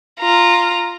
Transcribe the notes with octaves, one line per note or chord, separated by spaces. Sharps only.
F4 A#5